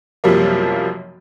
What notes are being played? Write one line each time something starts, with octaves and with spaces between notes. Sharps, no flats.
B1 F#2 C3 F3 G3 A#3